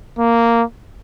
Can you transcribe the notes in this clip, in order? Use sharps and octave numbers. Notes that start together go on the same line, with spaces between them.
A#3